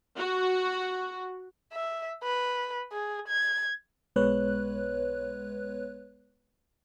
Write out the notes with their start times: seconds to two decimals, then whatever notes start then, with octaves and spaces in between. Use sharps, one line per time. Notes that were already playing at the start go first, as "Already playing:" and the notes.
0.17 F#4
1.72 E5
2.24 B4
2.92 G#4
3.28 G#6
4.16 B1 G#3 B3 B4 C#5 F#6